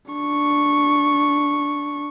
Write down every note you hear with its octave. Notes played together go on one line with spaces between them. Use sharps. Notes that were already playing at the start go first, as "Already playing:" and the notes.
D4 C#6